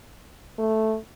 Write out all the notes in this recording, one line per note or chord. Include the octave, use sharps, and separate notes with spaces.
A3